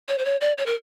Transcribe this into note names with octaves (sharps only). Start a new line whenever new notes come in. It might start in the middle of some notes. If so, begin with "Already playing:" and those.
C#5
C5
C#5
D5
C#5
A#4